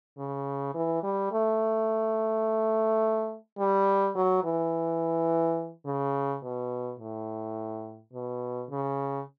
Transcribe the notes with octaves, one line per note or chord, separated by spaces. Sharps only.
C#3
E3
G3
A3
G3
F#3
E3
C#3
B2
A2
B2
C#3